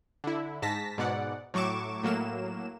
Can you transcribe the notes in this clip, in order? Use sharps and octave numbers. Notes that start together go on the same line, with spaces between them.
D3 E4
G#2 A5 A#6 B6
G#2 B2 D5 F#5
A2 F#3 C#6 D6 E7
A2 F#3 A#3 E7